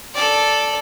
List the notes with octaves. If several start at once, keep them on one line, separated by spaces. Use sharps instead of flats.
A4 D5